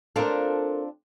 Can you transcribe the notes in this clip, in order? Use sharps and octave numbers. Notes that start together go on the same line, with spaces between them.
C4 D4 F4 A4 A#4